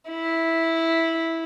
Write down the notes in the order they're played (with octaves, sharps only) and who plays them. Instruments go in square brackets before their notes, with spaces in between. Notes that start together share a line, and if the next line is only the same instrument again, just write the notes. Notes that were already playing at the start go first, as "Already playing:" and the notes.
[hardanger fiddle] E4